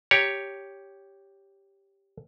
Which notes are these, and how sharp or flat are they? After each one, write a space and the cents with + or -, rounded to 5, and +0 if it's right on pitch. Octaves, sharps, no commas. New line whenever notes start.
G4 +0 C#5 +5 A#5 +0